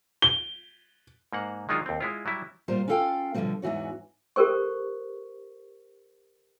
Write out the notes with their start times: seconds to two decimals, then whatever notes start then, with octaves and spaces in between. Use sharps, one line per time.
0.22 G7
1.33 G#2 A#3 F#5
1.69 D#3 F#3 G#3 D4 D#4 F4
1.86 D#2 C4
2.01 G#3 E4 F4
2.26 F#3 G3 E4
2.68 A#2 G3 F4 C5
2.88 C#4 E4 F4 A4 F5 G5
3.34 B2 D3 E3 F3 G3 C4
3.62 E2 G#2 E3 F#4 C#5
4.36 G4 A4 A#4 C5 C#6